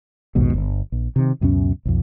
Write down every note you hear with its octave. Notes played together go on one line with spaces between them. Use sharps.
A#1 D#2 G#2 B2
G1
A#1
C3 D#3
C#2 F#2 B2 C#4
B1 F2